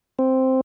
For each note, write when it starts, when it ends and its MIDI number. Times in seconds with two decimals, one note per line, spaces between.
0.19 0.61 60